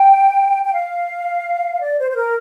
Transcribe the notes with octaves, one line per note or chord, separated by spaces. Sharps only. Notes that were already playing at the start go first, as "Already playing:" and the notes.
Already playing: G5
G5
F5
D5
C5
C5
A#4